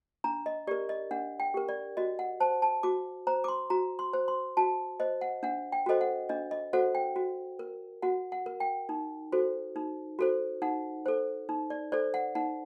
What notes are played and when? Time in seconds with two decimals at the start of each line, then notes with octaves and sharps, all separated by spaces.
0.24 D4 A#5
0.46 D#5
0.67 G4 A#4 D5
0.89 D#5
1.11 D4 F#5
1.40 G5
1.54 G4 A#4
1.69 D5
1.97 F#4 D#5
2.19 F#5
2.40 C5 A5
2.62 A5
2.83 F#4 D6
3.27 C5 A#5
3.44 D6
3.48 C6
3.70 F#4 A#5
3.99 C6
4.13 C5
4.28 C6
4.57 F#4 A5
5.00 C5 D#5
5.21 F#5
5.43 D4 F#5
5.72 G5
5.86 F#4 A4 C5 D#5
6.01 F#5
6.29 D4 D#5
6.51 D#5
6.73 F#4 A4 C5 F#5
6.95 G5
7.16 F#4
7.59 A#4
8.02 F#4 F#5
8.32 F#5
8.46 A#4
8.60 G5
8.89 D#4
9.32 F#4 A4 C5
9.76 D#4
10.19 F#4 A4 C5
10.62 D#4 F#5
11.06 A4 C5
11.49 D#4
11.70 D5
11.92 A4 C5 D5
12.14 F#5
12.35 D#4 F#5